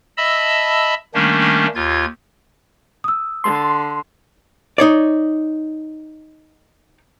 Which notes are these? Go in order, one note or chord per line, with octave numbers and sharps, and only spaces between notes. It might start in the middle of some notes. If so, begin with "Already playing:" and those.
D#5 E5 A5 B5 E6
D#3 G3 A3 A#3 C#4 D4
D#2 F4 G#6
D#6 E6
D3 C6
D#4 C#5 D5